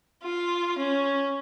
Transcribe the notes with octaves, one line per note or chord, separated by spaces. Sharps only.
F4
C#4